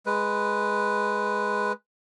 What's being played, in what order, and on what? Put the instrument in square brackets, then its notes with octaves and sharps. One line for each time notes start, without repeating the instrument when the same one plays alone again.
[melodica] G#3 B4